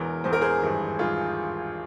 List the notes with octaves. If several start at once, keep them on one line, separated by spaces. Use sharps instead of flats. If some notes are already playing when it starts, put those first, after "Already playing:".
Already playing: E1 E2 E3 A#4
E1 E2 E3 C5
A#4
G#4 C5
G#1 G2 E3
G#1 G2 E3 F4 G#4